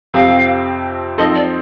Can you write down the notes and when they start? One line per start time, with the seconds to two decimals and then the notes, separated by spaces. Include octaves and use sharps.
0.14 F2 C3 F3 C4 G4 F5
1.18 F3 C4 D#4 A4 C5 D#5
1.35 D5